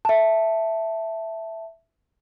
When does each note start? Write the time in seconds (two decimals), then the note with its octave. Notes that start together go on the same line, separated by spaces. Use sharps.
0.05 E5 A5